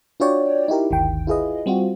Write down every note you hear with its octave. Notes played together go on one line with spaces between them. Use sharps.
D4 F4 F#4 C#5 D5 G5
D#4 E4 G4 A#4
G1 D2 D#3 G5
E4 F4 G#4 B4 D#5
G3 C4 F4 F#4